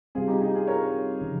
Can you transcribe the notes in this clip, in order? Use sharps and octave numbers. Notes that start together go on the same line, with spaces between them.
C3 G3 C4 F4 G#4
D#4 G4
D#4 G4
F4 G#4
A#4 C#5
C#3 F3